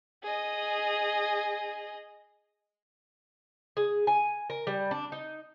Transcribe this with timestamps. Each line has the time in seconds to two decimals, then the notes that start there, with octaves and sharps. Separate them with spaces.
0.23 G#4 D#5
3.77 G#4
4.07 G#5
4.50 A#4
4.67 G3
4.91 D4
5.12 D#4